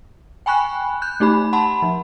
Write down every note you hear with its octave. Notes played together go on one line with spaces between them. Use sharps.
G5 G#5 B5 C#6 F#6
F#6 G6
A3 D#4 G4 B5
F#5 A5 B5 C6
F3